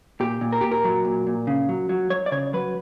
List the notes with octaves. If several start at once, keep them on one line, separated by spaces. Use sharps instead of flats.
A#2 G4
A#2
A#4
A#2 G4
A#4
F#3
A#2
A#2
C#3
F#3
F#3
F#3 C#5
D5
C#3 C#5
F#3 B4